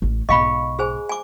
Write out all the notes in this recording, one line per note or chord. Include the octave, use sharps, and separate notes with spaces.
A1 C#4
B1 G#2 D#5 F5 B5 C#6 C#7
G#4 C5 G#5
G#5 D6